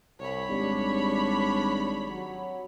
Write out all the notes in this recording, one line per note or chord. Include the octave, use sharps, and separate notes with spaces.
C2 C#5 B5
G#1 G3 D4
F#3